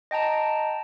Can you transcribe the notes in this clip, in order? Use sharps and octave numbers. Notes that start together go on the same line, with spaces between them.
D#5 G5 A5 A#5